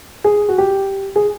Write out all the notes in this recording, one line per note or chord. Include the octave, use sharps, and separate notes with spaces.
G#4
F#4
G4
G#4